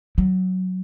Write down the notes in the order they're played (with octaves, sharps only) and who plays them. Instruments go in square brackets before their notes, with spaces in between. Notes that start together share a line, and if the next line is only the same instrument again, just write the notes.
[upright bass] F#3